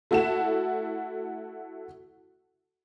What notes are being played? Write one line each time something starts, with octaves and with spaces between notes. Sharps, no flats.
A3 E4 F#4 A4 E7